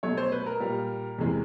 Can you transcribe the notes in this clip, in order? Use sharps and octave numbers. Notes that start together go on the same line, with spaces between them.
B2 F#3 A3 C#5
C5
B4
A#4
A#2 G3
E2 C3 E3 G#3